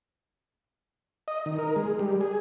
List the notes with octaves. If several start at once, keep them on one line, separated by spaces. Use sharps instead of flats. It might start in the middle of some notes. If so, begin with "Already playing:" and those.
D#5
D#3
A#4
G#3
G3
G#4